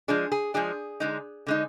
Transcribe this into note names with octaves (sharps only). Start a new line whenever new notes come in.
F3 G#3 D4 G#4
G#4
F3 G#3 D4 G#4
D3 G#3 D#4
D3 G#3 D#4